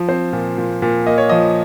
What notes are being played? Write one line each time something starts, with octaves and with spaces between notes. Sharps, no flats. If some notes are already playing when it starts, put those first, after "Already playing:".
Already playing: F3
C4 C5
A#2
A#2
A#2
A#3 D#5
C#5
F3 D#5